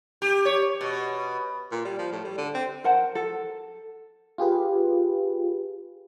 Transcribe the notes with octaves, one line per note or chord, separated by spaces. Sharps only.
G4
C#5
B2
A#2
G3
F3
A2
G3
D3
C4
A#4 C5 F#5 A5
A4
F4 G4 G#4 B4